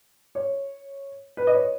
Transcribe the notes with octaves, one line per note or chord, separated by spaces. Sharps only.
C#5
B4
D#5
C#5